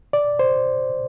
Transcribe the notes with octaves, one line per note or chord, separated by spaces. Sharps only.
D5
C5